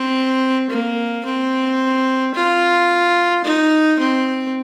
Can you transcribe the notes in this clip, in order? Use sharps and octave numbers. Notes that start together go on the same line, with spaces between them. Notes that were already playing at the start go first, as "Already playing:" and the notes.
Already playing: C4
A#3
C4
F4
D#4
C4